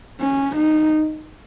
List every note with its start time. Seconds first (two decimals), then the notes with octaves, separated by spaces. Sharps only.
0.20 C#4
0.56 D#4